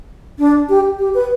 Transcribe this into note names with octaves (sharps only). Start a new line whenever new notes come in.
D4
G4
G4
B4